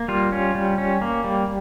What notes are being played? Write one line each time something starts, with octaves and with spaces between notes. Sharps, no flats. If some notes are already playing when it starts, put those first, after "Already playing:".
Already playing: A#3
G3 F4
C#4
G3
C#4
A#3
G3